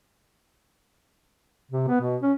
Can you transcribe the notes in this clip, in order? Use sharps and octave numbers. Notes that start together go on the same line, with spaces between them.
C3
B3
B2
C#4